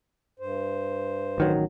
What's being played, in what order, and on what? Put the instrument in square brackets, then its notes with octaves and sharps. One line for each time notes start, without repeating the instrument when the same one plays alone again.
[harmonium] G2 C5
[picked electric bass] A1 D#3 F#3